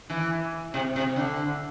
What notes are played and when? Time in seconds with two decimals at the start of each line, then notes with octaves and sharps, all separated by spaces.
0.10 E3
0.74 C3
0.96 C3
1.16 D3